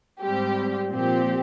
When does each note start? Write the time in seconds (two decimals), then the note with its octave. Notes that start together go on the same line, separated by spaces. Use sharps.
0.22 G#2 G3 C4 G4
0.90 A#2 F3 C4 G4